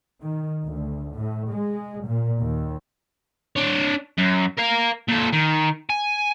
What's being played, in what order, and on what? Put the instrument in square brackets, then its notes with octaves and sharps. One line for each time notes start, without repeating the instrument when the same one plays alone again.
[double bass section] D#3
D2
A2
G#3
A#2
D#2
[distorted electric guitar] D4 C#5
F#2
A#4 F5
A#2 A4
D#3
G#5